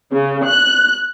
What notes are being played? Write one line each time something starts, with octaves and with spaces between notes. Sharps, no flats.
C#3
F#6